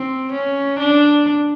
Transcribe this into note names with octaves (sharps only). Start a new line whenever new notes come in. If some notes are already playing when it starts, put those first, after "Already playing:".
Already playing: C4
C#4
D4